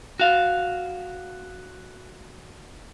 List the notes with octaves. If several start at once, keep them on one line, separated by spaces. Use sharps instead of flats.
F#4 F5